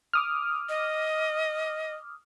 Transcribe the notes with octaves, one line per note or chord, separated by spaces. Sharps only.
D6 D#6 F6
D#5